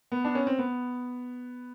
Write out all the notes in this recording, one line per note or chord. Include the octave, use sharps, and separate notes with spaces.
B3
D4
C#4
C4
B3